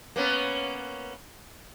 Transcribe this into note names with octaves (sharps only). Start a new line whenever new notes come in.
A#3 B3 C#4